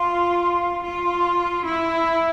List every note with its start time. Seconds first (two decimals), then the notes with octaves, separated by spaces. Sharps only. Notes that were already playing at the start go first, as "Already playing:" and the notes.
Already playing: F4
0.85 F4
1.67 E4